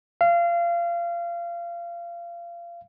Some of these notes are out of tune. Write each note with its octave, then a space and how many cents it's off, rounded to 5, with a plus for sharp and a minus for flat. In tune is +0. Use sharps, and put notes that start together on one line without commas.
F5 -25